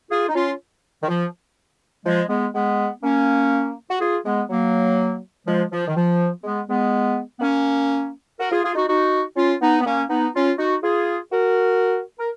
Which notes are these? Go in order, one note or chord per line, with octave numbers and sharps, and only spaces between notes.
F4 G#4
D#4
C#4 F4
D#3
F3
F3 G#3
G#3 B3
G#3 B3
A#3 C#4
F#4
F4 G#4
G#3 B3
F#3 A#3
F3 G#3
F3
D#3
F3
G#3 B3
G#3 B3
B3
A#3 C#4
F#4 A#4
F4 G#4
F4 G#4
D#4 F#4
D#4 F#4
C#4 F4
B3 D#4
B3
A#3 C#4
B3 D#4
C#4 F4
D#4 F#4
F4 G#4
F#4 A#4
A#4